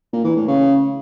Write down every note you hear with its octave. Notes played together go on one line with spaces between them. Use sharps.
A#2
E3
A2
C#3